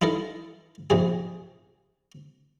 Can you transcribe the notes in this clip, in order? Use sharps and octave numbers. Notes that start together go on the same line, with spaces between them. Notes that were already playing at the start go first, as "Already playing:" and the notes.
D#4 E4 A4 A#4
A#1 C3 G#4